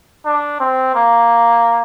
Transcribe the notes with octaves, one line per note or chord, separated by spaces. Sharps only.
D4
C4
A#3